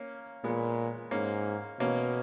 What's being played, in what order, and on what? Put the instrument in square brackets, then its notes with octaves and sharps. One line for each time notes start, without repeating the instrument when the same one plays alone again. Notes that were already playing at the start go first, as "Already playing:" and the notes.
Already playing: [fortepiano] A#3 C#4
[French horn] A#2 [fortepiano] G#3 B3
[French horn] G#2 [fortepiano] A#3 C#4
[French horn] B2 [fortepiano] A#3 C#4